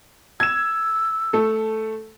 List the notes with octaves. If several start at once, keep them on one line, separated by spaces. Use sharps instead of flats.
E6 G#6 E7
A3 A4